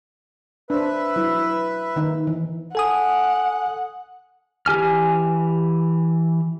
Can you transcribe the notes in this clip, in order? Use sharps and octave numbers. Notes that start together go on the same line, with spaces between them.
D4 B4 C5 E5
F#3 E4
D#3 D#4
E3
A4 F#5 G#5 D#6
E3 G4 G#5 F6